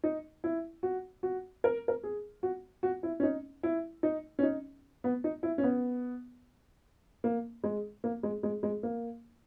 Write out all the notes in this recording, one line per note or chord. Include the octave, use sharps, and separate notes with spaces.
D#4
E4
F#4
F#4
A#4
A#4
G#4
F#4
F#4
E4
C#4
D#4
E4
D#4
C#4
D#4
B3
D#4
E4
C#4
B3
A#3
G#3
A#3
G#3
G#3
G#3
A#3